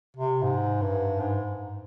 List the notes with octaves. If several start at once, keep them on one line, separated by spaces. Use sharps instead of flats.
C3
G#2
G2
G#2